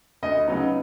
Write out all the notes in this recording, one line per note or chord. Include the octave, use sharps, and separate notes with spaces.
D2 D#5
C#3 F#3 B3 D#4